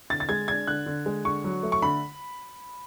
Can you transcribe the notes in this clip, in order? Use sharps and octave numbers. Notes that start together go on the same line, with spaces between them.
D3 A6
A6
G#3 G#6
D4 G#6
D3 F#6
D3
G#3
D3 C#6
F#3
A3
C#6
D3 B5